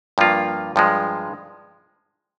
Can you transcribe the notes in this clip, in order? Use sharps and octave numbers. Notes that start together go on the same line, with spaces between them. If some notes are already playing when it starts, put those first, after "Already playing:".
G2 F3 A#3 F4
G2 F3 G#3